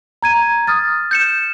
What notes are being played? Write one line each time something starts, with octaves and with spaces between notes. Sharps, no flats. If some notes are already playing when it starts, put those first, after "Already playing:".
A#5 G#6 D#7
D#6 F6 A6
G6 C#7 E7